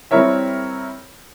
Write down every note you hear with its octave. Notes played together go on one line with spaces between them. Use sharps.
G3 C4 E4 A#4 C#5 E5